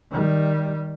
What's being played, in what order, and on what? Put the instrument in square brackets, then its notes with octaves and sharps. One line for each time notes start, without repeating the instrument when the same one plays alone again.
[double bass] D#3 G3